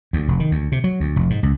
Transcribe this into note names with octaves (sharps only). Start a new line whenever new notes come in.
D2
F1
D#3
D2
C3
F#3
D2
F1
G#2
C#2